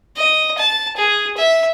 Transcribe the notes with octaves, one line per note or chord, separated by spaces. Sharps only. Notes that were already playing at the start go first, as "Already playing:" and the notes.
D#5
A5
G#4
E5